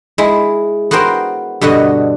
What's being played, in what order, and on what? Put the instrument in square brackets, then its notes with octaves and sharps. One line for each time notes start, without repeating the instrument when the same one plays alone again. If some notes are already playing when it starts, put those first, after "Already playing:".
[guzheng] G#3 E4
B3 F#4 A#4 C5 G5
G2 B2 D3 F#4 D#5